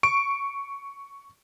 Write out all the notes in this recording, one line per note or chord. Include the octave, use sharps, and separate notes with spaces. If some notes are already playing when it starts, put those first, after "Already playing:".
C#6 D7